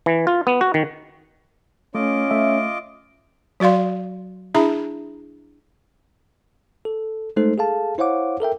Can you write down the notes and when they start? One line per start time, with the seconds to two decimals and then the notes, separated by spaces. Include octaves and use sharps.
0.06 E3
0.27 F4
0.47 B3
0.61 F#4
0.74 D#3
1.95 A3 C#4 F4 D#5 D6
2.31 A3 E5
3.60 F#3 F#4 D5 F5 C6
4.55 D4 E4 G#4 E5 A#5 B5
6.85 A4
7.36 G#3 A3 D#4 A4 C5
7.58 G#4 A4 F5 A5
7.98 E4 C5 C#5 F5 F#5 D6
8.40 A4 A#4 E5 G5